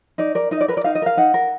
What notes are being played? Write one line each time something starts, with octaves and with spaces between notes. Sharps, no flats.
D#4 D5
A#4 D5
D#4 D#5
D5
A#4 B4
D5
D#4 F5
D#5
A#4 F5
D#4 F#5
A#4